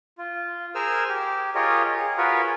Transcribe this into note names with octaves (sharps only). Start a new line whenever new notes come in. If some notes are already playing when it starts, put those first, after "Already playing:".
F4
G#4 A#4 C5 G#5 E6 F6
G4
F4 G4 G#4 A#4 C#5 D#5
G#4
F4 F#4 G#4 A#4 B4 C#5